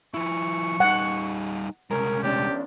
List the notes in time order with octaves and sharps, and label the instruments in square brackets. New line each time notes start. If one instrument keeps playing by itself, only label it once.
[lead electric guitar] F3 E4 [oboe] C#6
[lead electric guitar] G3 D#4 [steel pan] F#5
[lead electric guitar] C2 G#3 [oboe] C#4 [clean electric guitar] A#4
[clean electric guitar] E2 C#4 D4 [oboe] G4